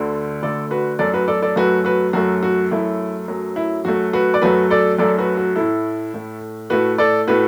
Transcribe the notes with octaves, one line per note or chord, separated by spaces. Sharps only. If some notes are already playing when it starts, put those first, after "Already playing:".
Already playing: D2 D3 A3
D2 D3 A3 A4 D5
F#4 B4
F#2 F#3 A3 A4 D5
F#4 B4
A4 D5
A4 D5
F#2 F#3 A3 F#4 B4
F#4 B4
F#2 F#3 A3 F#4
F#4
F#2 F#3 A3 E4
F#2 F#3 A3
E4
F#2 F#3 A3 F#4
F#4 B4
D5
F#2 F#3 A3 F#4 B4
A4 D5
F#2 F#3 A3 A4 D5
F#4 B4
F#4
A2 A3 E4 A4
A2 A3
A2 A3 F#4 B4
A4 D5
A2 A3 F#4 B4